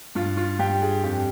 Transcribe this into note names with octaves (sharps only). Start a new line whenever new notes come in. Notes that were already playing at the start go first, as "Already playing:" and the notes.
G2 F4
F4
G2 G4
G#4
F2 G4